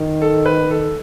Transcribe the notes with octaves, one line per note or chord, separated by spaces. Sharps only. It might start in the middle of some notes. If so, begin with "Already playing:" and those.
Already playing: D#3
A4
B4
A4